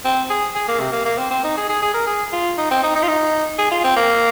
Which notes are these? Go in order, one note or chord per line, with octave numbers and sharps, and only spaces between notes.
C4
G#4
G#4
A#3
C3
A#3
A#3
C4
C4
D#4
G#4
G#4
G#4
A#4
G#4
F4
D#4
C4
D#4
D#4
F4
D#4
G#4
F4
C4
A#3